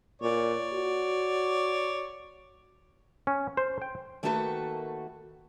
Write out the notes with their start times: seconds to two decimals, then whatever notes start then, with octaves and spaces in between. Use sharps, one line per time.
0.22 A#2 C#5 D5
0.74 F#4
3.27 C#4
3.57 C5
3.82 G5
4.23 D#3 A3 A#3 F#4 A4 B4